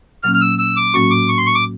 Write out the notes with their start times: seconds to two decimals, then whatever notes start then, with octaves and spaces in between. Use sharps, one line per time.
0.23 A#2 F#3 A#3 C#4 F6
0.34 F6
0.41 E6
0.59 E6
0.76 D6
0.94 A2 F#3 A#3 C#4 F#4 C#6
1.11 D6
1.29 C#6
1.38 C6
1.46 C#6
1.55 D6